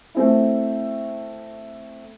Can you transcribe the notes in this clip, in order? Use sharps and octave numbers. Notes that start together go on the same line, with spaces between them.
A3 C4 E4